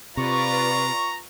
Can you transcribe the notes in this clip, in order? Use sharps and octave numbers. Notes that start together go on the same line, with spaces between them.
C3 F4 B4 D5 A#5 C#6